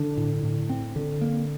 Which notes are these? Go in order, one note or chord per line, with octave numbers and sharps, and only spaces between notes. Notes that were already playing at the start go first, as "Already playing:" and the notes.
Already playing: D3 D4
A2
A2
C4
D3
A#3